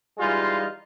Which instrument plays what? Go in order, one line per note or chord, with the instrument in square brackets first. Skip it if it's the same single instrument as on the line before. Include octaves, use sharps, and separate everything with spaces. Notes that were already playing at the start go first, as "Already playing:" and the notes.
[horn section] E3 G3 G#3 D#4 F4